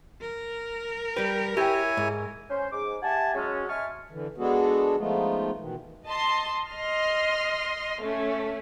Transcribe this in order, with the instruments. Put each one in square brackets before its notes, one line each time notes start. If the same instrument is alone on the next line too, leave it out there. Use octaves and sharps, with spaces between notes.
[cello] A#4
[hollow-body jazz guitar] G3 B4 [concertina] G5
[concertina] E4 C#5 G#5 [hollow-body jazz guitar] G4 G5
[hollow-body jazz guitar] G#2
[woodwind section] C#4 C5
G#2 D6
G4 E5 F#5 G#5 A5
F#3 G#3 C#4
D#5 E5 G#5 A5 C#6 F6
[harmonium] D3 E3
G#3 B3 D4 F#4 G#4 A4
F3 G#3 A3 B3 D#4 F4
B2 D#3 E3
[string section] D#5 A5 C6
D#5 C6 F6
A3 C#4